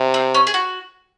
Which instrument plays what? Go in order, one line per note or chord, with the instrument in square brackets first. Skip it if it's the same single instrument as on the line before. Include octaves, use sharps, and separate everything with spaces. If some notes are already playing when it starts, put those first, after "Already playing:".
Already playing: [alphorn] C3
[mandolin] C4
C#4
G#4
F#4